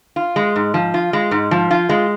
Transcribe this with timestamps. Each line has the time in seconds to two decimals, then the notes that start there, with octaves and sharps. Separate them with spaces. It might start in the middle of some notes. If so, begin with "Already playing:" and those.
0.16 F4
0.36 G#3
0.56 G#2
0.74 F3
0.94 F4
1.13 G#3
1.31 G#2
1.51 F3
1.71 F4
1.89 G#3